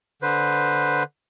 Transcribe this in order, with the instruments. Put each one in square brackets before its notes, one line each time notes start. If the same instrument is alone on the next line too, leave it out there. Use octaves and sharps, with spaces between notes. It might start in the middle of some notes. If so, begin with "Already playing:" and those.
[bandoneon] D3 B4 C5